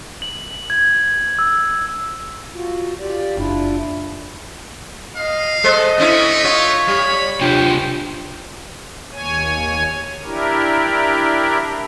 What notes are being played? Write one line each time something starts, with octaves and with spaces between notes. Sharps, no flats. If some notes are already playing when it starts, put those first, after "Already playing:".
F#7
G#6
E6
F4 F#4
F4 G4 D5
F#1 D4 E4 F4
D#5 F5
G#3 A4 C5 D#5
A3 C4 C#4 E4
F4 C#5
G3 B5
C3 D4 F4 G5
D#2 C#5 G#5
D4 E4 G4 A#4